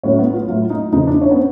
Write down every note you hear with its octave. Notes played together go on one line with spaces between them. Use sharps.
A2 F#3 A3 C#4
B3
F4
A2 F#3 A3 F4
D#4
E2 C#3 F3 D#4
D4
C#4
B3
C4